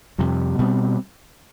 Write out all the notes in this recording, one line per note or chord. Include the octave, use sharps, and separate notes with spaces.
F2 C3 G3
B2 G3 C4